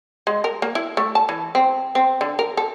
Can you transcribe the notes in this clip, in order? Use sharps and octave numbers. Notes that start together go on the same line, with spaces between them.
G#3
A#4
A#3
E4
A3
A5
E3
C4
C4
D3
A#4
A4